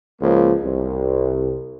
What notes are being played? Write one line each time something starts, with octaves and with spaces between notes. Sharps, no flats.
C#2 F3 A#3
C2